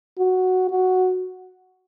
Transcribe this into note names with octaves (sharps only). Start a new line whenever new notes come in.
F#4
F#4